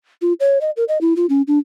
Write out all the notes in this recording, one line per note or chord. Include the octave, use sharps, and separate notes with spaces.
F4
C#5
D#5
A#4
D#5
E4
F4
C#4
D4